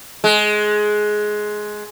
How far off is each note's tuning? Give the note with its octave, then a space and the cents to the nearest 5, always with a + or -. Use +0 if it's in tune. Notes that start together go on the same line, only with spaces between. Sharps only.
G#3 +15